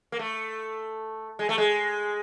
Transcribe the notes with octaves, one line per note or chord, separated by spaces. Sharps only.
A#3
A3
G#3
A3
G#3